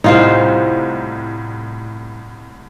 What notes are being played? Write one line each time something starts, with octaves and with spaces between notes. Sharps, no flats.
C2 A2 D#4 F4 C5